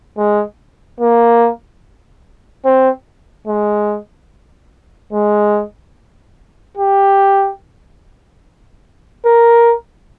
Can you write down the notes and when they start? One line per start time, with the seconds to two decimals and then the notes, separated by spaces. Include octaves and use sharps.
0.17 G#3
1.00 A#3
2.65 C4
3.47 G#3
5.13 G#3
6.77 G4
9.25 A#4